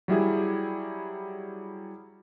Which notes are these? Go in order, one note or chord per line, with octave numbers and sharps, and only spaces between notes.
F#3 G3 E4 G#4